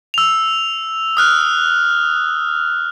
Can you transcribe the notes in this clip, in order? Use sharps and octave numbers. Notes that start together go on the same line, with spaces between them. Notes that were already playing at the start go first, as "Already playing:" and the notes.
E6 F7
D#6 F6 F#6